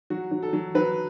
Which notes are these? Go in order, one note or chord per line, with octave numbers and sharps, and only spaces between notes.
F#3 F#4
F#3
A4
F#3
F#3 B4